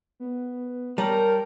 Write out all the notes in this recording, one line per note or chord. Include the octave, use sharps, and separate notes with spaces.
B3
G3 A#4 C#5 G5 A5